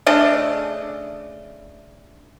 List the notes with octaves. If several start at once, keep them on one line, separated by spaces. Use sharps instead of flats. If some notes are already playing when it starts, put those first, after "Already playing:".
C#3 A3 D4 D#5